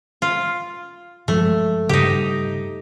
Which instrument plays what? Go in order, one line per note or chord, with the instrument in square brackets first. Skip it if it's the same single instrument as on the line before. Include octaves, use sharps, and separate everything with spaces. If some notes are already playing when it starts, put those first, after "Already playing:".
[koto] F4
[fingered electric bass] G2 F3 G#3 [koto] A3
[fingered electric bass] G2 C#3 [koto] D#4 G4